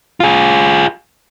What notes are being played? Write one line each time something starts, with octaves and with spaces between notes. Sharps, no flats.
F4 G#4